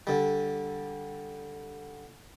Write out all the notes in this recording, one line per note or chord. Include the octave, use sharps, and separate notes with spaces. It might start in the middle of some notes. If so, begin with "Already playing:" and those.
D3 G3